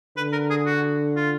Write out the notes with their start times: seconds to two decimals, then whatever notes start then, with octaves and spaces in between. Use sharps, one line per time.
0.17 D3 B4
0.32 A#4
0.50 G#4
0.66 F#4
1.16 F4